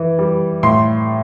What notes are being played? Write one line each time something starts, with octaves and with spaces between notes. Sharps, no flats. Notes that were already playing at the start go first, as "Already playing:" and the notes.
Already playing: E3
G3
A2 C6